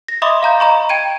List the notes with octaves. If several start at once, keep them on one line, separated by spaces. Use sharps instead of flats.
A#6
D#5 E5 B5 C6 D6 D#6
F5 A#5 G6
D#5 A#5 B5 C#6
G5 G#6 D7 D#7